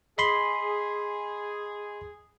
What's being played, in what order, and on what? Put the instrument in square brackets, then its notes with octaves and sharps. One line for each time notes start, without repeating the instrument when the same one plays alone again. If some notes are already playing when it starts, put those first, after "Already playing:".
[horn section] G#4 [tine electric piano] D#5 B5 C6